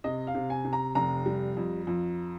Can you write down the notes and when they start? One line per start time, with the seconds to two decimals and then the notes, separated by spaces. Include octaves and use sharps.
0.04 C3 D#5
0.27 F5
0.35 C3
0.50 G#5
0.65 C3
0.73 A#5
0.95 F1 A#5
1.26 G3
1.57 F2
1.87 F2